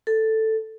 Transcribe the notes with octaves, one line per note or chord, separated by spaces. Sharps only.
A4